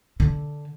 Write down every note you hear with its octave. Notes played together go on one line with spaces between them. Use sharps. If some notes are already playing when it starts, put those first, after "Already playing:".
D3